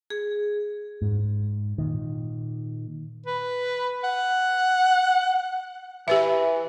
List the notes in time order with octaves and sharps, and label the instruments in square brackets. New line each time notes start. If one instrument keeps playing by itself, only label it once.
[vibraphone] G#4
[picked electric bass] G#2
A#2 D#3
[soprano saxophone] B4
F#5
[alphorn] E3 [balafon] G4 B4 E5